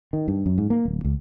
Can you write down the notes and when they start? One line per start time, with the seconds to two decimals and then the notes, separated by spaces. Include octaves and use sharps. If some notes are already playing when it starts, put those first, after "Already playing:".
0.13 D#3
0.28 G2
0.46 F#2
0.58 G#2
0.70 A#3
0.85 D1
1.04 C#2